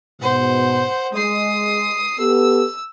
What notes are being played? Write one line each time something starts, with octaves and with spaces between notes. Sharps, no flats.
G#2 B2 C5 F#5
G#3 D#6 C7
B3 G4 A4 E6